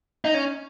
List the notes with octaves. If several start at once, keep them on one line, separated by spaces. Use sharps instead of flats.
D#4
C#4